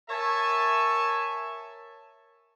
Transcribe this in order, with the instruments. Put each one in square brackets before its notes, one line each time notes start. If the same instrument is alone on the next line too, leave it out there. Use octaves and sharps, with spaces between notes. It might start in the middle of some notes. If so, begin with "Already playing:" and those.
[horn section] A#4 C#5 E5 G#5 A5